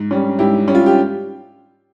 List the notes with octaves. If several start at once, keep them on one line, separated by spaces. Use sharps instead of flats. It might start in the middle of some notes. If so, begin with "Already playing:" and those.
Already playing: G#2
G3 C#4
G#2 E4 G4
G3 C#4
F4
G4